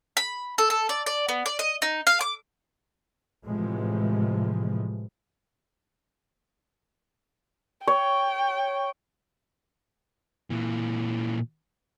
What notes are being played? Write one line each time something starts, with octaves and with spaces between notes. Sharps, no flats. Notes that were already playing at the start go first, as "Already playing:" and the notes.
B5
A4
A4
D5
D5
B3
D5
D#5
D#4
F5
D6
A2 C3 E3 F3 G#3
C#5 G5
A#2 E3